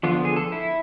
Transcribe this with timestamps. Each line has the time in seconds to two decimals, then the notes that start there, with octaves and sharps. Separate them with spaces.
0.03 D3 F3 B3 F4
0.25 G#4
0.36 A4
0.52 E4